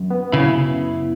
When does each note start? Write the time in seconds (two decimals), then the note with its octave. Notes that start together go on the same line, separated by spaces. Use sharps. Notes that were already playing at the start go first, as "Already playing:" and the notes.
Already playing: F#2
0.10 B3
0.32 C#3 E4